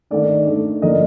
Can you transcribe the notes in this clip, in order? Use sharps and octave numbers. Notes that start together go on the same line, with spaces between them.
D#3 A3 D4 D5
D#3 A3 D4
D3 F3 A#3 D4 D#5